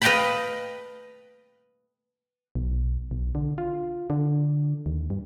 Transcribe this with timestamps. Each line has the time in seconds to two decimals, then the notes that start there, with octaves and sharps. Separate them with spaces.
0.02 B4 D#5 F5 G5 A5 B5
2.55 B1
3.11 B1
3.35 D3
3.58 F4
4.10 D3
4.86 D#2
5.10 G2